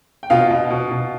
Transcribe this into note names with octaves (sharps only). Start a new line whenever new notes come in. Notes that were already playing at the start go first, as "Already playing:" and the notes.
G5
B2 F4 F5
B2
B2
B2